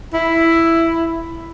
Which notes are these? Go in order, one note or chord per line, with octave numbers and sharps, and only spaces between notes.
E4